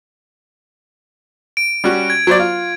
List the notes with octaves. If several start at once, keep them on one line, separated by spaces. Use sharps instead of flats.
D7
G3 C#4 F#4
G#6
F#3 C5 D5
F4